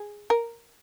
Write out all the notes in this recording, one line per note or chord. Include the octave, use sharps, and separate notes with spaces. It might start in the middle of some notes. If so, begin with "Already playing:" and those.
Already playing: G#4
A#4